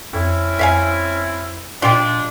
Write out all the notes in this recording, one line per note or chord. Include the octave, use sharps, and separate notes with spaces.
F2 C4 C#4 E4
F2 E5 F5 G#5
A#2 F3 G#3 D4 F4 G4